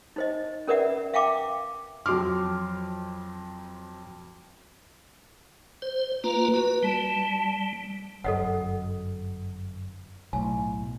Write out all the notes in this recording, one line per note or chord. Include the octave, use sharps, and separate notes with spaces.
D#4 C5 D#5
C#4 A#4 B4 D5 E5 F#5
E5 F5 G5 A5 D6
F2 F#3 C6 D6 F6
C5
A#3 F4 B4 A#5
F#4 B4
G3 A5
G1 F#2 A4 D#5 F#5
B1 A2 G#5